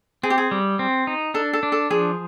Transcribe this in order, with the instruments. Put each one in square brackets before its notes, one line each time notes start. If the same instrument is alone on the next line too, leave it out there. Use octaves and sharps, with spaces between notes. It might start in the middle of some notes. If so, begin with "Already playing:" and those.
[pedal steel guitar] C4 [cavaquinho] G#4
[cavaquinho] G4
G#4
[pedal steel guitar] G3
C4
D#4
[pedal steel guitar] D4 [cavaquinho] A4
[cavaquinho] A4
[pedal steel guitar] D4
[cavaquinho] A4
[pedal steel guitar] F3 [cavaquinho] G#4